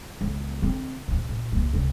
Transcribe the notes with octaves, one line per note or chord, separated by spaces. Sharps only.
C#2 B3
D3 C4
D2 A#2
A#2
C#2 A#3
C#2 C3